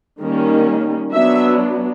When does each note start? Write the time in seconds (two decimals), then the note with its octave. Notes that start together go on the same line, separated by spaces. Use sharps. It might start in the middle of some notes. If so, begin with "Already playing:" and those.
0.21 D#3 G3 A#3 C#4
1.12 F#3 B3 D4 E5